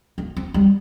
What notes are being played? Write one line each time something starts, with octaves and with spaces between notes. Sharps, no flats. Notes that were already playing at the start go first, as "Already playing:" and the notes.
A#3
C4
G3